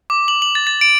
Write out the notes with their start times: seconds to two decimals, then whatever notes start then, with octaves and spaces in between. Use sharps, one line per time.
0.10 D6
0.28 F#7
0.42 F#7
0.55 A6
0.67 A6
0.81 D7